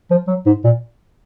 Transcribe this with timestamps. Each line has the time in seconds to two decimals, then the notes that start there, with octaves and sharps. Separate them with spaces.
0.11 F3
0.28 F#3
0.46 G#2
0.64 A#2